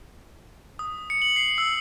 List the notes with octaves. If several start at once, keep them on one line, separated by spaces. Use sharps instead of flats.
D#6
C#7
F#7
C7
E6